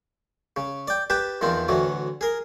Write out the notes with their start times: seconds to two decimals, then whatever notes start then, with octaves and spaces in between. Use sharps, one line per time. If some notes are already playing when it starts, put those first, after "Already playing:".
0.56 C#3
0.88 D5 G5
1.10 G4 B4 G5 A5
1.41 E2 D#3 F3 C4
1.68 D2 A2 E3 F#3
2.21 G#4 A#4